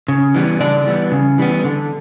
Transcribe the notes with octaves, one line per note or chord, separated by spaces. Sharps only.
C#3
E3 G3 B3
C#3 D4 D5
E3 G3 B3
C#3
E3 G3 B3
D3